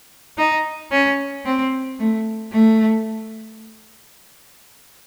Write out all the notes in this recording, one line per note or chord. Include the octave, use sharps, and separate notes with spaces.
D#4
C#4
C4
A3
A3